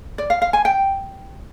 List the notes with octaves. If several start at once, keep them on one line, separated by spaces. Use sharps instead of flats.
D5
F5
F5
G#5
G5